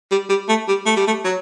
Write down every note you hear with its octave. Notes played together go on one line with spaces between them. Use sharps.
G3
G3
A3
G3
A3
G3
A3
F#3